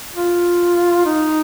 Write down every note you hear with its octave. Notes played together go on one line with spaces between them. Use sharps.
F4
D#4